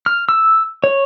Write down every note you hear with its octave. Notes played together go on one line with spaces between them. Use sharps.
F6
E6
C#5